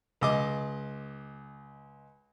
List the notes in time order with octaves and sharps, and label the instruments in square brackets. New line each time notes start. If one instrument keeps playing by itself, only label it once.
[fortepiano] C#2 D#5 D6